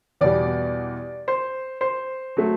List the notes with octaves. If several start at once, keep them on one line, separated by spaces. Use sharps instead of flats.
E2 B2 G3 D5
C5
C5
F#3 A3